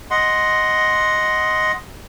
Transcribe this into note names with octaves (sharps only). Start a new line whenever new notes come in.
D#5 F#5 C6